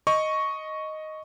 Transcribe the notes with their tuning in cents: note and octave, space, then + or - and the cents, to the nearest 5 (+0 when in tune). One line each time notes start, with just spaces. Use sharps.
D#5 +0 C#6 +0